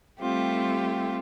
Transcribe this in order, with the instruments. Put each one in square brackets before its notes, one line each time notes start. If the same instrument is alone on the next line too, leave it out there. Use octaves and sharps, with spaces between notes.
[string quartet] G3 A3 C4 F4 G4